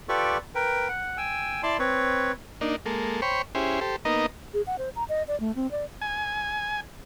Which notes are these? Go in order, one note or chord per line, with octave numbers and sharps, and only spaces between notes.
F4 G4 A4 B4 D5 C#6
A#4 B4 G5
F#5
G5 G#5 E6
E4 D5 A5 C6
C4 B4 C#5
A#3 D4 D#4
G#3 A#3 A4
C5 C#5 G5 B5 C#6
C#4 E4 G4 G#4 C5
G4 A4 C5
A#3 B3 D#4 D#5 A#5
G#4
F#5
C5
A#5
D#5
D5
A3
C4
D5
G#5